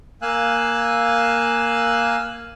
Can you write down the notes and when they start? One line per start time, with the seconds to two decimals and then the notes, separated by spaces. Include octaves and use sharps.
0.22 A#3 F5 G#5 E6 F#6